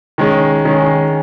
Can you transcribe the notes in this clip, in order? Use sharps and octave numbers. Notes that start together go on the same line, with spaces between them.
D#3 G#3 C#4
D#3 G#3 C#4